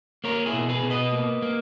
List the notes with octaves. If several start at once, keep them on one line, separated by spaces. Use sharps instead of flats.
A#3 A#4 C#5
E4 G#4
B2
G#4 B4
B2
B4 D#5
A#3
A#3